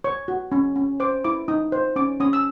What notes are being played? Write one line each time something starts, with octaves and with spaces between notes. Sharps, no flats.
C#5 C#6
F#4
C#4
C#4
C5 D6
E4 D6
D#4 D#6
C5
C#4 D6
C#4 D#6
E6